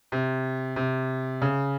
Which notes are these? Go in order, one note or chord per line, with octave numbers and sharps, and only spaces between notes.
C3
C3
C#3